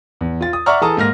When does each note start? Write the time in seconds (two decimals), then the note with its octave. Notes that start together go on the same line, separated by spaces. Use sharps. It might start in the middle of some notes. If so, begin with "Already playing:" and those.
0.21 E2
0.41 F4 A6
0.53 D#6
0.66 D5 E5 F#5 A#5 C#6 F6
0.81 E3 G#4 A4 A5 A#5 D#6
0.97 G#2 A#3 F6 A#6